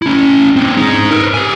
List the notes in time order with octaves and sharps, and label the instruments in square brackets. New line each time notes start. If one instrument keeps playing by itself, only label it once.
[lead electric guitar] C#4 E4
C4 D4
D#4 G#4
A#4 B4
G4 G#5